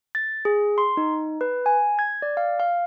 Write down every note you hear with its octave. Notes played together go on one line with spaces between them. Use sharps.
A6
G#4
C6
D#4
B4
G#5
G#6
D5
F5
F5